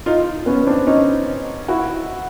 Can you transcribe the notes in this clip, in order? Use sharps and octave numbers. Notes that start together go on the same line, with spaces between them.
D#4 F4
B3 C#4
C4 D4
C#4 D#4
E4 F#4